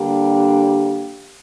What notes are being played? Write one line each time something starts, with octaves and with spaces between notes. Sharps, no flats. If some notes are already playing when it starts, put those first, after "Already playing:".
Already playing: D3 G3 A#3 D4 G4